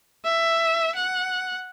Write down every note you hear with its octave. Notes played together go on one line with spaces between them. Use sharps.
E5
F#5